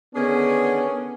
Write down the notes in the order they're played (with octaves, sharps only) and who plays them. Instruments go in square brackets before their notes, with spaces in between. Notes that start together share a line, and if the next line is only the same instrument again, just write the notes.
[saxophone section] D3 D#3 G#4 [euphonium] B3 [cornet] C#4